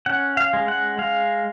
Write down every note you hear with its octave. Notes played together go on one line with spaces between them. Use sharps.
C#4 F#5
F5
G#3
F#5
G#3 F5